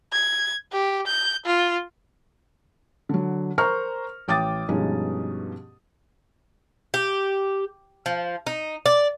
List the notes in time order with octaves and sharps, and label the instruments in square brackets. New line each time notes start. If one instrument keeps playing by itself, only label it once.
[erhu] G#6
G4
G6
F4
[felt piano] D3 F#3
A#4 C5 A#5 C#6 F6
A1 G5 D6 D#6 A6
G2 B2 F3 G#3 C#4 D#4
[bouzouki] G4
F3
D#4
D5